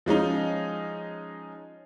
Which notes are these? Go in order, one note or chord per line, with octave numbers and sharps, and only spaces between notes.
F3 G#3 C#4 D#4